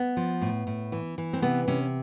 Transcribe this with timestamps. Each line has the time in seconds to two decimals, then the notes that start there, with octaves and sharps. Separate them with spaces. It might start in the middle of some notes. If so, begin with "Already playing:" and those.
Already playing: B3
0.17 F3
0.42 A2
0.67 A2
0.92 E3
1.18 E3
1.33 C4
1.42 C3 B3
1.68 C3 C#4